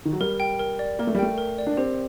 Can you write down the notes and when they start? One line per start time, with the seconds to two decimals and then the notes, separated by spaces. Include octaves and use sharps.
0.05 D#3
0.13 F#3
0.20 G3 A#4
0.40 G5
0.60 A#4
0.79 D5
0.99 A#3 A#4
1.07 A3
1.15 G3
1.19 A3 G5
1.38 A#4
1.58 D5
1.67 D4
1.77 C4 G4